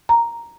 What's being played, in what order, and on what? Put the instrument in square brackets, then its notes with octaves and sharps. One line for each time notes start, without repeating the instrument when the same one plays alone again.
[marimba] A#5